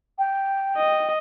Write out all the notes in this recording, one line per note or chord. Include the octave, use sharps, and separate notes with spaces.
G5
D#5